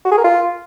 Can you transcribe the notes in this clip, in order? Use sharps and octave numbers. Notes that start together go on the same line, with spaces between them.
F#4
G#4
A#4
F4